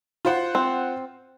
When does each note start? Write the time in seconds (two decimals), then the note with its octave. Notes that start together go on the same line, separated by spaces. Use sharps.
0.25 F4 C5 F#5
0.55 C4